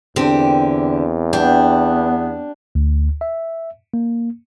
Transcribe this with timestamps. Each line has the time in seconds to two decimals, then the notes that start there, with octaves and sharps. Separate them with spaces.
0.16 E2 D3 C4 G4
1.33 B3 D4 G4
2.75 D2
3.21 E5
3.94 A#3